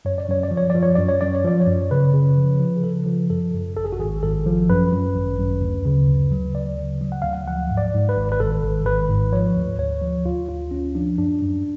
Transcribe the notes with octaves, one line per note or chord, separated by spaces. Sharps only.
F#2 C#5
D5
F#2 C#5
D5
F3
C#5
F3 D5
C#5
F#2 D5
C#5
F#2 D5
C#5
F3 D5
C#5
F#2
C#3 B4
C#3
F3
F3
G#4
C#3 A4
F3
F#2 A4
F#2
G#1 A4
G#4
F#4
G#1 G#4
G#1 A4
F3
F#2 B4
F#2
G#1
F#2
D2
C#3
D2
F#3
D2 D5
C#3
F#3
F#5
D2 F5
F#5
F3 F#5
G#2
D5
G#2
B4
G#1
B4
G#1 A4
G#1
G#1 B4
G#2
F3 C#5
D2
D2 C#5
F3
D2 F4
D2 F4
D2 C#4
F3 D4
F#2 D4
F#2